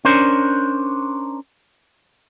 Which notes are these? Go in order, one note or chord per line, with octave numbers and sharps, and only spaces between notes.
C#4 D4 A#4 C5